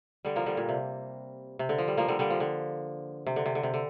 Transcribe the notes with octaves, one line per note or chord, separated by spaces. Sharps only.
D3 G3
F3 A#3
D3 G3
A#2
C3
C3
D3
F3
G3
F3 A#3
D3 G3
D3 G3
F3
D3
C3
D3
C3
D3
C3
D3